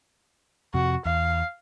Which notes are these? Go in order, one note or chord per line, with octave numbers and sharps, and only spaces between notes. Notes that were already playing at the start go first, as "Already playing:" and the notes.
F2 C3 F#4
E2 F5